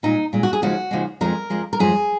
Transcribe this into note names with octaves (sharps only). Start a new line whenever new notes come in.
A#2 G#3 D#4
A#2 G#3
F#4
G#4
D#2 C#3 F3 G#3 F#4
D#2 C#3 F3 G#3
F2 F3 G#3 A#4
F2 F3 G#3
A#4
F#2 F3 G#3 G#4